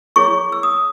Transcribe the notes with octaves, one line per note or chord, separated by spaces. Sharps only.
E4 G#4 C#5 C#6
E6
D#6